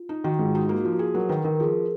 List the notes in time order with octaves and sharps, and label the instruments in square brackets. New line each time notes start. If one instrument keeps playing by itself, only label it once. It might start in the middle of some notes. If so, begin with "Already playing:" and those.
Already playing: [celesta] F4
[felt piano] D#4
[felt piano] D#3 [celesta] F#4
[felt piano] G#2 [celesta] F4
[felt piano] D#4 [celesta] F#4
[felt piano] A#3 [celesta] F#4
[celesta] F#4
[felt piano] F3
[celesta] F#4
[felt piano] G#4
[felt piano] F#3 [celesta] A#4
[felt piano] D#3 [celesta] B4
[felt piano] D#3 [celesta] A#4
[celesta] A#4
[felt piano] F3 [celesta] G#4